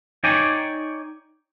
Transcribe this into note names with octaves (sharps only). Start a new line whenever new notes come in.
D#4 C#5 D5 G5 G#5